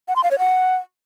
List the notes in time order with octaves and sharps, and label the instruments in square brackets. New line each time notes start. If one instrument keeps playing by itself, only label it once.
[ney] F#5
C6
F5
C#5
F#5